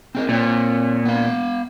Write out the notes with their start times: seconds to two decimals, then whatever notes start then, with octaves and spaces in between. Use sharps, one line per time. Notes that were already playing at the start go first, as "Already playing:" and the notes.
0.15 C4 G#4 A#4
0.29 A#2 C4 C#5
1.05 B3 F5